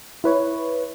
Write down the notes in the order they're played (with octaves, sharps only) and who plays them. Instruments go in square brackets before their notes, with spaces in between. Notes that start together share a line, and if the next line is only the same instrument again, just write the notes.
[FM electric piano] E4 B4 C#5